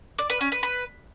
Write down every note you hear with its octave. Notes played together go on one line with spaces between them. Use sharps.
D5
B4
C#4
B4
B4